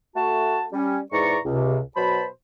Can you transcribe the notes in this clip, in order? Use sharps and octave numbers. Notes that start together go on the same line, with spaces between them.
A3 F#4 A5
G3 C#4
E2 G#2 E3 D5 A#5 C#6
C#2 C3
B2 F#3 C5 A5 B5